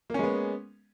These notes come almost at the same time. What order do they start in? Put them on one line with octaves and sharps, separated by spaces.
A#3 C#4 G#3 B3